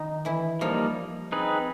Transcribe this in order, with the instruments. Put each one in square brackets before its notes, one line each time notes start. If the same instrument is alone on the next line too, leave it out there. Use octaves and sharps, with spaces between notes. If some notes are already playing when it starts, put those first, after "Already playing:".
Already playing: [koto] D#3 D#4
E3 E4
[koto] F3 F4 [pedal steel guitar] G3 A#3 D#4
[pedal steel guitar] C4 D#4 G#4 B4